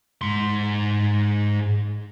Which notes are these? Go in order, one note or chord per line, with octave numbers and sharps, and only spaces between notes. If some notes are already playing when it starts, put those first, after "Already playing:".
G#2 C6